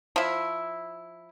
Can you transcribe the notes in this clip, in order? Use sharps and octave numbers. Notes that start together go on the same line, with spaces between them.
F3 E4